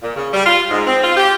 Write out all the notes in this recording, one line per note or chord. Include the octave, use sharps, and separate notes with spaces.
A#2
C#3
G3
F4
G#2
C4
F4
G4